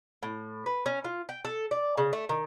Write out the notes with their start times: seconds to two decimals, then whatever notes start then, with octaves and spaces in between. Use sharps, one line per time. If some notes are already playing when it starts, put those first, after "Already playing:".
0.23 A2
0.66 B4
0.86 C#4
1.04 F4
1.29 G5
1.45 A4
1.71 D5
1.98 C#3
2.13 A3
2.29 D#3